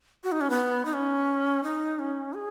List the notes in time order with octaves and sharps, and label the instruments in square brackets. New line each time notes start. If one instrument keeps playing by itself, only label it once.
[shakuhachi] F#4
D#4
C#4
B3
D#4
C#4
D#4
C#4
G#4